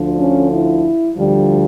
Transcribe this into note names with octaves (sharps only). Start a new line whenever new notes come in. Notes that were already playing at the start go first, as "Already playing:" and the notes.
Already playing: D2 D3 F3
C#4
E4
D2 D3 F3 G3